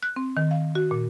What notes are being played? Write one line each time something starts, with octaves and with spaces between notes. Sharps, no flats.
F#6
C4
D#3
F5
F#4
A#2